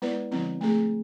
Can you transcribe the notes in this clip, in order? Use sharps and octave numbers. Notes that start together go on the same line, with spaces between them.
G#3 B3 E4 B4 D5
D3 F3 G#3 C4 E4
A3 C4 G#4